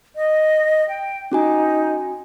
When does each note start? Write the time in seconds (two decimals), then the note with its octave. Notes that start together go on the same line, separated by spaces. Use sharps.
0.16 D#5
0.88 G5
1.32 C#4 D#4 F#4 G#5